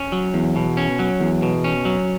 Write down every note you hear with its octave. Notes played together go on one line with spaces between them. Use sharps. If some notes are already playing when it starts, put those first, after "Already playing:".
Already playing: C#4
F#3
E2
B2
C#4
F#3
E2
B2
C#4
F#3